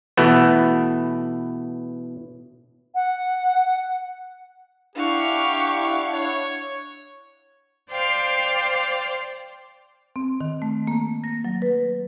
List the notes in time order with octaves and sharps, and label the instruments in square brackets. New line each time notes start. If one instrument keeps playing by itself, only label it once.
[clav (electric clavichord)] B2 E3 A3 B3
[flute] F#5
[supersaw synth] D4 E4 F#5 [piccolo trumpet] G4 [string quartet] F5 C#6
[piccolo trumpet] C#5
[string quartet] C5 D5 F5 G5
[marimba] C4
D#3
A3
A#3
A#6
F#3
B4